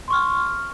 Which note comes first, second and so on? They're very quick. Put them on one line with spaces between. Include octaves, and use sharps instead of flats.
C6 C#6 F6